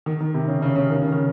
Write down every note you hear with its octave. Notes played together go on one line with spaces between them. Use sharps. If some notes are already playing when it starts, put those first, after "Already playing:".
D#3
D#3
C3
C#3
C#3
C#3
D#3
C#3
D#3